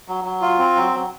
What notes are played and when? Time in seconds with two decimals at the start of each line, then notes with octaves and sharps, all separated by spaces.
0.08 F#3
0.25 F#3
0.42 F4
0.59 C4
0.76 F#3
0.93 F#3